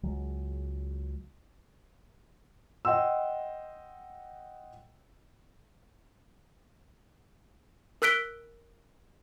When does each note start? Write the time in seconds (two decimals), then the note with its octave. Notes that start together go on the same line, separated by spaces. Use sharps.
0.03 C#2 F#3 G#3
2.85 D#5 F#5 G5 C6 E6
8.02 A#4 E6 F#6 B6 D7 G7